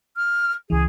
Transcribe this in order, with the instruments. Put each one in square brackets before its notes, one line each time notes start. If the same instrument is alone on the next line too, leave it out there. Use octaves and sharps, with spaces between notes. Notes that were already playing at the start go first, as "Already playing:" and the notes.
[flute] F6
[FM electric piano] C#2 E3 [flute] G#4